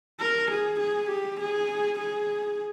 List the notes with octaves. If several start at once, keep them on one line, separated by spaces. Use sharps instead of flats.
A#4
G#4
G#4
G4
G#4
G#4